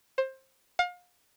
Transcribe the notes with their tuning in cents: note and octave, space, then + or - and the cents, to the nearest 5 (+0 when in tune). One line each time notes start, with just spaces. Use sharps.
C5 +20
F5 +35